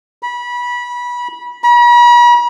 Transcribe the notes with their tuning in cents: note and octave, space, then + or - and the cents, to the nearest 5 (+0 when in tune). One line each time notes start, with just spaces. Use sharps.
B5 -25
B5 -45